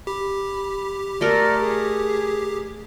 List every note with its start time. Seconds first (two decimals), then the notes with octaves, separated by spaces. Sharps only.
0.07 G4 B5
1.21 A3 A4 A#4 D5
1.60 G#4